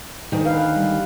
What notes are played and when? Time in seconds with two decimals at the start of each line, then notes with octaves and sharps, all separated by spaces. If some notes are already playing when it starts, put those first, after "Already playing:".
0.32 D2 D#3
0.46 B4 F5
0.76 G3